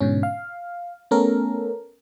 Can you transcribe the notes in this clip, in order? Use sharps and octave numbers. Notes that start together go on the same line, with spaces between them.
G#2 B2 D3 C#4
F5
A3 B3 C#4 A4 A#4